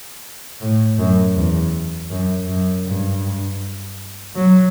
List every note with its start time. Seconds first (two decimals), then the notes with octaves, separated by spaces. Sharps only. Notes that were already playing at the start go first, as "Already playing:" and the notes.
0.61 A2
0.98 F#2
1.35 E2
2.11 F#2
2.48 F#2
2.86 G2
4.36 F#3